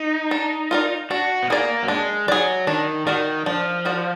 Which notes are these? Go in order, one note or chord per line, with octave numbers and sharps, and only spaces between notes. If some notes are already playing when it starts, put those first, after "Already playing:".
Already playing: D#4
D4
F4 A#4 D5
D4 F#4
B3
A#3 G#4 D5
F#3
G#3 D4
F#3 G#4 D5
D#3 D4
D#3 F#4 A#4 D5
F3 D4
F#4 A#4 D5